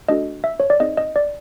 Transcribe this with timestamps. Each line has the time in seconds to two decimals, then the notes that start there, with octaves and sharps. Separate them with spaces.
0.08 A3 D4 F#4 A4 D#5
0.44 E5
0.60 C#5
0.70 D5
0.80 C4 D#4 G#4 D#5
0.97 D#5
1.16 D5